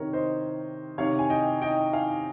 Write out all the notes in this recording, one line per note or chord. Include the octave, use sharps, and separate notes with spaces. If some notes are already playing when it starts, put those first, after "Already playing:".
Already playing: C3 D#3 A#4 C#5
C5 D#5
C3 D#3 C#5 F5
G#5
D#5 G5
D#5 G5
F5 G#5